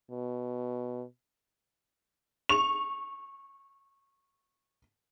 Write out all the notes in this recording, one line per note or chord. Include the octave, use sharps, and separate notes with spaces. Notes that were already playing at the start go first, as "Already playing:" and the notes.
B2
C#6 F7